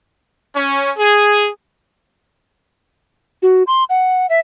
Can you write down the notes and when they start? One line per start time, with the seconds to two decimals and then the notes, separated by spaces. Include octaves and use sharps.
0.56 C#4
0.98 G#4
3.42 F#4
3.67 C6
3.89 F#5
4.29 E5